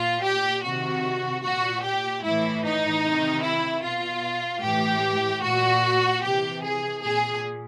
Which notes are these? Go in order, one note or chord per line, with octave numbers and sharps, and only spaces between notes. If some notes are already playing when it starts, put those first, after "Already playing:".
Already playing: A#2 F4
G4
C3 D#3 F#4
A#2 F#4
G4
A2 E3 E4
D#4
C3 D#3
E4
B2 F4
A2 E3 G4
A#2 F#4
C3 E3 G4
G#4
A#2 G#4